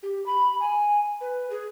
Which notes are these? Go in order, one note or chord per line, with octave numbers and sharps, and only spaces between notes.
G4
B5
G#5
B4
G#4